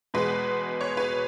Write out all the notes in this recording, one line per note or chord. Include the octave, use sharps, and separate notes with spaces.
E2 B2 G#3 B4
C#5
B4